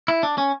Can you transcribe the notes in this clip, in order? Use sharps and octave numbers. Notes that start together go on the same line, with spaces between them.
E4
D4
C#4